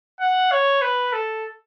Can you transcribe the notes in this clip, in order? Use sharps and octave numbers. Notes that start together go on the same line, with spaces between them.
F#5
C#5
B4
A4